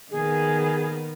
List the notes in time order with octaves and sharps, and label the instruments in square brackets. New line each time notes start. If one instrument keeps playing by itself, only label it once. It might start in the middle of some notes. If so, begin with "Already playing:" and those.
[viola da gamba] D#3 B3 [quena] G#4